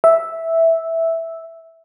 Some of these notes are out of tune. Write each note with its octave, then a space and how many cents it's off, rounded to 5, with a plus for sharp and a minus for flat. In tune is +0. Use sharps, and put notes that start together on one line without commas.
E5 -5